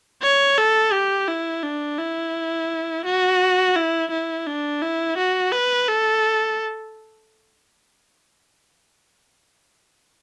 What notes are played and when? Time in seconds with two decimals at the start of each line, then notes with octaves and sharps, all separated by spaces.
0.22 C#5
0.58 A4
0.92 G4
1.28 E4
1.63 D4
1.98 E4
3.05 F#4
3.76 E4
4.11 E4
4.47 D4
4.82 E4
5.17 F#4
5.52 B4
5.88 A4